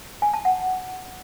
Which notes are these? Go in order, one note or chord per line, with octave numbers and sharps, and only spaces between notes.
G#5
A5
F#5